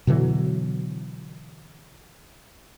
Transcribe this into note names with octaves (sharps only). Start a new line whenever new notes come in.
B2 D3 E3 F#3